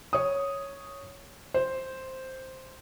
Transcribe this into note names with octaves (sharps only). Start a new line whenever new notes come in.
C#5 D#6
C5